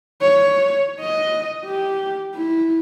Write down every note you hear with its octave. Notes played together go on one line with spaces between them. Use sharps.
C#5
D#5
G4
E4